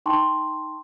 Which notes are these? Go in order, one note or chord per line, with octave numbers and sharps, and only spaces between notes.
D#4 G5 A5 C6 C#6